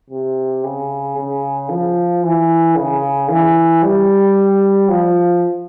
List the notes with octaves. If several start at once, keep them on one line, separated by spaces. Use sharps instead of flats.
C3
C#3
C#3
F3
E3
C#3
E3
G3
F3